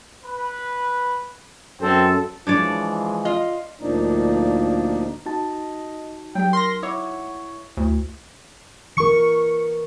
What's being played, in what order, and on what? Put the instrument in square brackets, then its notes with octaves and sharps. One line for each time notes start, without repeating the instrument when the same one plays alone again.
[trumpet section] B4
[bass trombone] F#2 [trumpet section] C4 [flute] A4
[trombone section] E3 F3 G#3 [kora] D4 C#5 D5
[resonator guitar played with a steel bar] F4 D#5
[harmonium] D2 A#2 F3 A#3 D4 D#4
[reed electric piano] D#4 F#4 A5 [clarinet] D#5
[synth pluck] F#3 G4 [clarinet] G5
[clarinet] A#4 [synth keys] C6 A#6
[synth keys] E4 C#5 [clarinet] F#5 [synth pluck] D6
[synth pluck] D2 [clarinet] E4
[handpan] E3 A#4 [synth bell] C#6 C#7